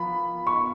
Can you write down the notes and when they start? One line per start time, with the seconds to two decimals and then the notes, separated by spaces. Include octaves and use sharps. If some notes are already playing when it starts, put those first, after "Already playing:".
Already playing: F3 B3 F4 A#4 B5
0.47 C#6